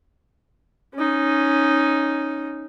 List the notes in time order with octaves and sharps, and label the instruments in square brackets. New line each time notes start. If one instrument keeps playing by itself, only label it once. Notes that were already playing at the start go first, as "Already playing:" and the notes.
[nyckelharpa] C#4 D#4